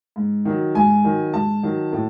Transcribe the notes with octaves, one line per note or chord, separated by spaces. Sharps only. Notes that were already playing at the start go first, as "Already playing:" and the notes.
G#2
D#3 F#3
G#2 G#5
D#3 F#3
G#2 A5
D#3 F#3
A2